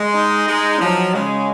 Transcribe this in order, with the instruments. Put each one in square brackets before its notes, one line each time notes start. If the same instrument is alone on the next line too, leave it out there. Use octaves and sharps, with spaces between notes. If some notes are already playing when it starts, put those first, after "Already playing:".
Already playing: [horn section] G#3
[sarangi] D#4
[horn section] G#3
[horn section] F3 [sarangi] F#3
[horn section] C#3 [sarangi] G#3